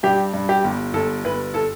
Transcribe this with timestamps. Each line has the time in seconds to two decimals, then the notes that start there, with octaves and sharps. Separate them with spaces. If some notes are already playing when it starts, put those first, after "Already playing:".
0.03 G2 G4
0.34 G2
0.49 G4
0.64 G1
0.94 G1 A4
1.24 G1 B4
1.54 A4